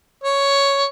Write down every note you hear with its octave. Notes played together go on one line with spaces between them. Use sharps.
C#5